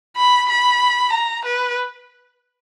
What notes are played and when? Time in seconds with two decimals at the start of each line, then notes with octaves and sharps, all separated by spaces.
0.17 B5
0.49 B5
1.12 A#5
1.45 B4